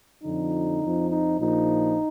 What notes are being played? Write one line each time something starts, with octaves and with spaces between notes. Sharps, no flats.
F2 D3 F3 D#4
F2 F3
D#4
A#1 A#2 F3 D#4